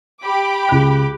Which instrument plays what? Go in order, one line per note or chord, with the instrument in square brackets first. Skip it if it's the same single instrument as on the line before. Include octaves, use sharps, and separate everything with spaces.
[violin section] G4 B5 D6
[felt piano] C#2 F#6